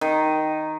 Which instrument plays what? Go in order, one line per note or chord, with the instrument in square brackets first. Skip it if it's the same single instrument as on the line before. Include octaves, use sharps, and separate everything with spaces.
[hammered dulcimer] D#3